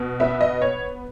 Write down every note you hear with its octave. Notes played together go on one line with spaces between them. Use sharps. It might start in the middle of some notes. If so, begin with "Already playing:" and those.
Already playing: B2
B3 E5
D#5
C#5